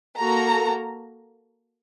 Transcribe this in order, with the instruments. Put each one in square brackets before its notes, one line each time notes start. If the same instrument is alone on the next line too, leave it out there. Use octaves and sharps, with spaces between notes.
[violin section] A#3 F#4 A4 A#5